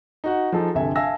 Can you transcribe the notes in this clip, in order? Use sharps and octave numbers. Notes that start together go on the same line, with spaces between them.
D#4 F#4 F#5
F3 D#4 G#4 A4
G1 C3 A4 E5 G#5
E5 F5 G#5 A5 E6 A#6